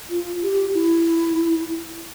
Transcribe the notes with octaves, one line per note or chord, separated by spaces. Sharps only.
F4
G4
E4